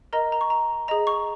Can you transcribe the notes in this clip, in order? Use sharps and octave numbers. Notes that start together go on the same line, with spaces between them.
A#4 D#5 A#5
A#5
C#6
A#5
G#4 D#5 A#5
C#6